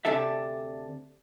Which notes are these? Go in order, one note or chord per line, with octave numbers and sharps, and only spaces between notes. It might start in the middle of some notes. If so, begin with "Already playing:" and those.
D2 C3 D4 A4 E5